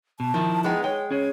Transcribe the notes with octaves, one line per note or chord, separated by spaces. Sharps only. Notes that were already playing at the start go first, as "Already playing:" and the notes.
B2 A5
D#3 F3 E4
G#3 B3 D#4 G5
G#3 C#5 G5
C#4 G#4 C#5